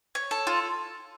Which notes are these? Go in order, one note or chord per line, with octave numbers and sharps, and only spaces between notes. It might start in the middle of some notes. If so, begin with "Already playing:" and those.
C#5
A4
F4